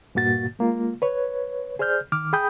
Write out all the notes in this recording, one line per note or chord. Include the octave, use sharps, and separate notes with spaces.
G2 A#2 A#3 F#4 A6
G#3 A#3 F4
B4 C#5
G#4 C5 D5 F6 G6
D#3 D6 F6
G#4 G5 B5 D#6 G6